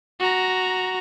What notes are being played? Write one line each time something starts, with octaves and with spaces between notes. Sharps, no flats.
F#4 A#5